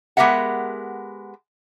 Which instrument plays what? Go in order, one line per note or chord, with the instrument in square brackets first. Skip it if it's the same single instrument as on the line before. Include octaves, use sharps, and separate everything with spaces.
[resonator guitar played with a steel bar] G#3 B3 G4 A#4 E5 F#5